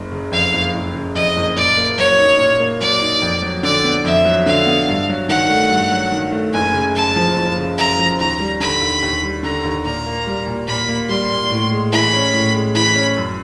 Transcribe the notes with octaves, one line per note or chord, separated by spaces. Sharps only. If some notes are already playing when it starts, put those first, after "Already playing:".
Already playing: F#1
C#3
F2 F5
F#1
F#1
C#3
F2 D#5
F#1
A#2 D5
A#3
F#3 C#5
D#4
A#2
A#3
F#3 D5
D#4
F2
F#3
D3 D5
B3
F2 E5
F#3
D3 F5
B3
G2
F#3
D#3 F#5
A3
G2
F#3
D#3
A3
F#1 G#5
C#3
F#2 A5
F3
F#1
C#3
F#2 A#5
F3
D#2 A#5
G3
D3 B5
D#2
D#2
G3
D3 A#5
D#2
A#2 A#5
A#3
G3
A#2
A#2 B5
A#3
G3 C6
A#2
A2
G#3
E3 B5
C#4
A2
G#3
E3 B5
C#4
F#2